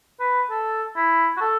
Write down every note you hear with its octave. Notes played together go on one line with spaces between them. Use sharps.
B4
A4
E4
F#4
A4